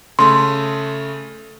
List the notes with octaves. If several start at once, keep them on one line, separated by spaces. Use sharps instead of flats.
C#3 A3 C6